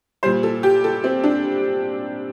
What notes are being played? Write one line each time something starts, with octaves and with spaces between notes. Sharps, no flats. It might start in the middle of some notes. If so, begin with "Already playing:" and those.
A#2 G3 C5
A4
G4
A4
C4
D4